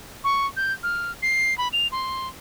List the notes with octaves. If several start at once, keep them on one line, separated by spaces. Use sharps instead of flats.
C#6
G6
F6
C7
B5
F7
C6